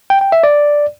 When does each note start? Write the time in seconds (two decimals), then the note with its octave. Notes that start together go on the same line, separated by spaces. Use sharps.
0.10 G5
0.21 G5
0.32 E5
0.43 D5